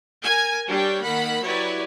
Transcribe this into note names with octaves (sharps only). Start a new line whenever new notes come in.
A#4 G#5
G3 D4 C#5 G5
D#3 A#3 F#5 B5
F#3 E4 G4 B4 C#5 D5